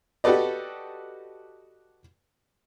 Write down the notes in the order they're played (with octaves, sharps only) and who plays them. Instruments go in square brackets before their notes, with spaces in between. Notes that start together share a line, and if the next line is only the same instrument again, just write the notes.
[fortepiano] F#4 G4 A4 B4 D5 D#5